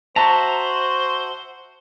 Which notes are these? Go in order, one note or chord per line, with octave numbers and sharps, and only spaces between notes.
F#4 C5 E5 A5 A#5